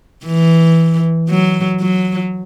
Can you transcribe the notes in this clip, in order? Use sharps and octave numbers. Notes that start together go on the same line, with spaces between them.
E3
F#3
F#3